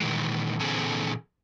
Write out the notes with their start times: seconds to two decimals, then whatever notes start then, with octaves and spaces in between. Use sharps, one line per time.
0.01 A#2 D#3 E3 G#3
0.60 A#2 D3 E3 C4 G#4 A4